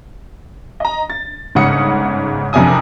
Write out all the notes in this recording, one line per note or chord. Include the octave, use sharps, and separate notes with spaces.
D#5 A#5
A6
G1 G#2 C#3 F#5 D#6 C#7
F#1 F2 C3 D4 G#5 D#6